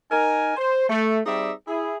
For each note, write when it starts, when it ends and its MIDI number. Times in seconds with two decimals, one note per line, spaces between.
0.11 0.56 63
0.11 0.56 70
0.11 0.56 80
0.57 0.85 72
0.89 1.20 57
1.26 1.52 55
1.26 1.52 60
1.26 1.52 63
1.26 1.52 68
1.26 1.52 74
1.26 1.52 76
1.67 1.96 64
1.67 1.96 68